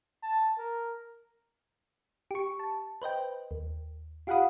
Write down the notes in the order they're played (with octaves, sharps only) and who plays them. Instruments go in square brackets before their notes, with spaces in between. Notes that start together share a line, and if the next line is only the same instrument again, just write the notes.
[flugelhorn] A5
A#4
[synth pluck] G4 C#6
A5
B4 C5 D#5 G5
D#2
F4 G4 F5 F#5 B5 D#6